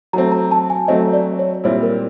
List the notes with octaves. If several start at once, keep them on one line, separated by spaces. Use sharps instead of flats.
F#3 A3 C4 A#5
A#5
A5
G#5
F#3 A3 C4 D#5
D5
C#5
A#2 G3 C4 E4 C#5
A#4